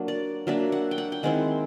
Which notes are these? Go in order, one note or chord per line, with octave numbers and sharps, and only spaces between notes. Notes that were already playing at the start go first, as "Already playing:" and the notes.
Already playing: F#3 A#3 D4
D5
F#3 A#3 D4 E5
F#5
G5
F#5
G5
D#3 G#3 C4 E4 F#5